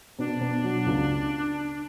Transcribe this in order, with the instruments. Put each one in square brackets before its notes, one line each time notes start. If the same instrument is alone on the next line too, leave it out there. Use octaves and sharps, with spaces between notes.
[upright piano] B2 [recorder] D4
[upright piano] B2
F#3
C#2